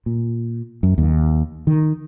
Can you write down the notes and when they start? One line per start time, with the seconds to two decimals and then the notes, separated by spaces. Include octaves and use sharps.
0.06 A#2
0.83 F#2
0.98 D#2
1.67 D#3